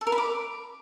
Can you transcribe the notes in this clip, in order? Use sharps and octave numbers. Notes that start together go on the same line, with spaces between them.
A4
A#4
B5
D6